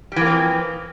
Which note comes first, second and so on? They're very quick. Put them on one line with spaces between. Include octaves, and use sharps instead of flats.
G3 E3 A#3 C4 F3